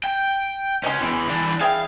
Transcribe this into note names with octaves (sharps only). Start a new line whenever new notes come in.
G5
C#2 B2 C#4 C6
E2 E3
E3 D4
G#4 E5 F5 G5